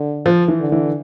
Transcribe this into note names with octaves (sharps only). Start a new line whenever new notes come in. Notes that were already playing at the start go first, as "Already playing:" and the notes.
Already playing: D3
F3
E3
D3
E3